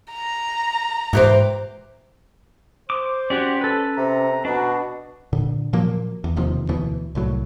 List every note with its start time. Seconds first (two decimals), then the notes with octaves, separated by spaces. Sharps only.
0.13 A#5
1.13 G#2 E3 G4 C5
2.90 C5 D6
3.30 C#4 F#4 G4 D5
3.61 A4 B4
3.97 C3 A#5
4.45 B2 D4 F#4
5.33 A#2 D3
5.73 A#2 F3 F#3 A#3
6.24 E2
6.36 E1 D#2 C3 F3
6.69 D2 B2 E3
7.15 C2 A2 F#3